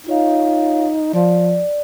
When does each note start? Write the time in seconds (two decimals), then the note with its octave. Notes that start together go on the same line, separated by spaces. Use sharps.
0.07 D#4 F4 C#5 F5
1.14 F3 D5